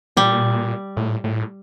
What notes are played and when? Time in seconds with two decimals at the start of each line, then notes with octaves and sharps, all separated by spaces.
0.17 A#2 G3
0.97 A2
1.24 A2